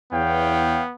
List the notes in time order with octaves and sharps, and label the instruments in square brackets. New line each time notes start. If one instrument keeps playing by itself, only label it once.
[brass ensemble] E2 [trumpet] B3 [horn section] C#5 F5 G5